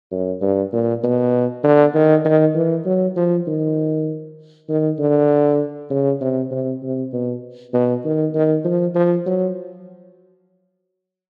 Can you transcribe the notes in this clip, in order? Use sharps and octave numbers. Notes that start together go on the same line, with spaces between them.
F#2
G2
A#2
B2
D3
D#3
D#3
E3
F#3
F3
D#3
D#3
D3
C#3
C3
C3
C3
B2
B2
D#3
D#3
F3
F3
F#3